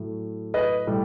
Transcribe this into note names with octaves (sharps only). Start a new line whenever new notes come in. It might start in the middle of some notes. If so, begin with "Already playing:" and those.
Already playing: A2 F#3
B4 D#5
A2 G3